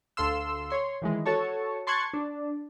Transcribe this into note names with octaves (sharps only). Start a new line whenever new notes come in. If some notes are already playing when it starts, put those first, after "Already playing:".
D2 A4 F5 C6 E6
C#5 C6
D#3 E3 G#3
F#4 A4 C#5 A5 C#6
A5 C6 C#6 F#6 G#6 A6
D4